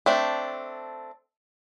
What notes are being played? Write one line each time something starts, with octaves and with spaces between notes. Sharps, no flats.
A3 C4 D4